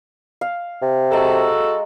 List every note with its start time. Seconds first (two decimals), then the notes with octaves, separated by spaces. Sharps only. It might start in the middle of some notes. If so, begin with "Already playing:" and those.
0.41 F5
0.82 C3
1.11 G#3 F#4 A4 A#5